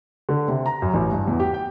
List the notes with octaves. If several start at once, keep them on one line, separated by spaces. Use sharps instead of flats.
D3
C3
A#5
F#2
A1
G2
E2
G4
G5